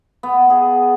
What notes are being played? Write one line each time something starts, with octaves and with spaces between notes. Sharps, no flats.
B3
G#4